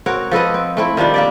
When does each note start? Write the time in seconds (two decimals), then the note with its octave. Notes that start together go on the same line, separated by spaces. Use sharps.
0.06 C4 F#4 A#4 C#5
0.31 F3 A4 B4 D#5
0.54 C4
0.77 A3 C4 E4
0.97 D#3 F3 G3 D4
1.14 A#3 G4 D5